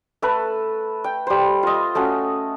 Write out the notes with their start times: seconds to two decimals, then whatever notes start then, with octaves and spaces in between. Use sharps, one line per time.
0.22 A3 A4 B4
1.04 G5
1.27 G3 C5
1.63 F4 D#5
1.95 A3 C#4 F#4